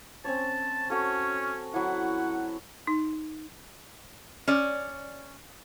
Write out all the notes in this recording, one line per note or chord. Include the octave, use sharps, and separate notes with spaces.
C4 C#4 C#5 A5
C#4 F#4 A4
F#3 E4 F#5
D#4
C#4 D5